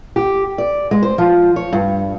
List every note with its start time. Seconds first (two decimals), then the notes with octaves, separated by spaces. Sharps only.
0.16 G4
0.58 D5
0.91 G#3
1.03 C5
1.18 F3
1.56 C#5
1.73 G2